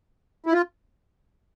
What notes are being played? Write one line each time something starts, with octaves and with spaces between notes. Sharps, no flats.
E4
F4